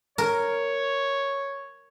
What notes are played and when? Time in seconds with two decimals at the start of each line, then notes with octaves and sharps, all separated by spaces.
0.18 A#4 C#5